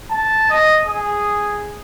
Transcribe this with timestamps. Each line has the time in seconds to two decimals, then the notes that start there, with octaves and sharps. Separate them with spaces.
0.10 A5
0.50 D#5
0.87 G#4